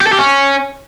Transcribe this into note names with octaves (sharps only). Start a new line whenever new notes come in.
G4
A4
G4
C#4